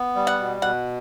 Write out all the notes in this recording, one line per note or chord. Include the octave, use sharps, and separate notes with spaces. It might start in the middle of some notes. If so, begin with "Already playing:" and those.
Already playing: B3
G3
F#5
B2
B2 F#5